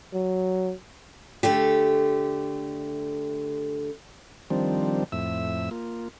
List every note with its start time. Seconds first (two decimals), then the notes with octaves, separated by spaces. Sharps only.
0.13 F#3
1.43 D3 A3 G4
4.50 D#3 F3 G3 C4 D4
5.12 F2 A2 E5 E6
5.71 A#3 F4